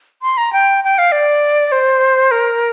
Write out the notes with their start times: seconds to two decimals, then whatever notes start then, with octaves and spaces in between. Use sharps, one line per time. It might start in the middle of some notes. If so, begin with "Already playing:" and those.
0.23 C6
0.37 A#5
0.53 G5
0.84 G5
0.98 F5
1.12 D5
1.72 C5
2.31 A#4